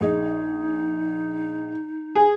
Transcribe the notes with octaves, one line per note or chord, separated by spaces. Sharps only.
A#1 D#4 G#4 D#5
G#4